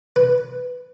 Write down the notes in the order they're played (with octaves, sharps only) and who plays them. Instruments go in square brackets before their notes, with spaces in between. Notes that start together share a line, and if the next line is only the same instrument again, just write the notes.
[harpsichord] B4